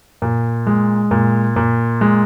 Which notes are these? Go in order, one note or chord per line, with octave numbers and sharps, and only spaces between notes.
A#2
G#3
A#2
A#2
G#3